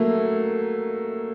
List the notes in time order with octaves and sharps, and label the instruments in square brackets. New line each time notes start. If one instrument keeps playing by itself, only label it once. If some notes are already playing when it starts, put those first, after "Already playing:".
Already playing: [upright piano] F#3 A3 A#3